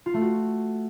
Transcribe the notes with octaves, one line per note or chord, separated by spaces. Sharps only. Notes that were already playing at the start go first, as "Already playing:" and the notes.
F4
A3
F#4